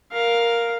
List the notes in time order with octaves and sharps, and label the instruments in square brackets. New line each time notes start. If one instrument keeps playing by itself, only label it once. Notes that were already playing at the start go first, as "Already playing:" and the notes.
[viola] A#4 [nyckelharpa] F5